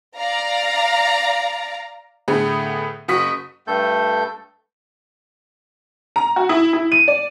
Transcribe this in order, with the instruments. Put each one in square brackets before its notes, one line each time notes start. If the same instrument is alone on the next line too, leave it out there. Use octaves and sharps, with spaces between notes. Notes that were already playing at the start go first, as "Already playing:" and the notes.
[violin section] D5 F5 A#5
[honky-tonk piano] A2 D3 A3 B3 G#4
F#1 F#4 C#6 D#6 B6
[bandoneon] G2 A3 A4 G6
[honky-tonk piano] A#5
F#4
E4
E4
D#7
D5